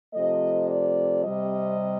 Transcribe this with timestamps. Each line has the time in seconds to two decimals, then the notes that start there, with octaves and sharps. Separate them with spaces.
0.14 C3 F3 A3 D#5
0.69 D5
1.24 C3 G3 D#5